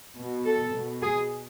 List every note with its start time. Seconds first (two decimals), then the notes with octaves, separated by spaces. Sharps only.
0.18 B2
0.46 A4
0.75 B2
1.02 G#4